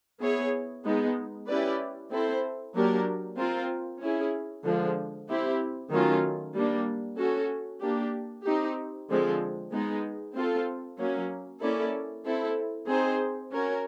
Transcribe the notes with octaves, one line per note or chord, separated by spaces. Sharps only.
B3 E4 G#4 C#5
G#3 B3 D#4
C#4 E4 G4 B4 D5
C4 E4 A4 C5
F#3 A#3 D4 G4 A#4
C4 F4 A#4
C#4 E4 G#4
D3 F3 G#3
C4 E4 G4
D#3 F#3 A3 C#4 F4
G3 A#3 D4
C#4 F#4 A4
A#3 D4 G4
C4 D#4 G4
D3 F3 G#3 C4
G#3 B3 D#4 G#4
C4 F4 A4
F#3 A#3 C#4
A#3 C#4 E4 A4 D5
C4 E4 A4
C4 D#4 G#4 C5
C#4 F#4 A#4 C#5